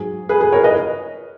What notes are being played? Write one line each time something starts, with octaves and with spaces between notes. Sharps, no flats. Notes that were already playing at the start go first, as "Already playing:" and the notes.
Already playing: G#2 F#3 G#4
G#4 B4
G#4 B4
A#4 C#5
B4 D#5